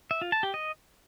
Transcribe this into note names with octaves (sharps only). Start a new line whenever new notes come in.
E5
F4
A5
G4
D#5